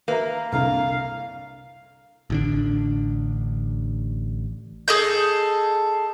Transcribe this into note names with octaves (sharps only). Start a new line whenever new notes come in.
A#3 B4 E5 A#5
C2 D3 F5 A#5
A1 D3 D4
G#4 A4 D#5 G6